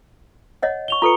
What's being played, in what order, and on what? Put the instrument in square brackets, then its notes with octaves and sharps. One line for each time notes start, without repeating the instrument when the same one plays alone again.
[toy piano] C#5 D#5 F#5
[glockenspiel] C#6 F7 G7
[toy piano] F4 A4 B4 [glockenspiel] A#5 C#7